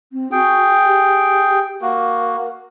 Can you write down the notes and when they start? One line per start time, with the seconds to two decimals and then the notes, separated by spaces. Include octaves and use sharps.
0.12 C4
0.32 F#4 G#4 G5
0.86 G4
1.81 A#3 F#4 A#4